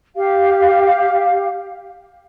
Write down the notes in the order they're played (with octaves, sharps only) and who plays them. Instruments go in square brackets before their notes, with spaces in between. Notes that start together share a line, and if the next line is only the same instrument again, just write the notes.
[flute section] G4 F5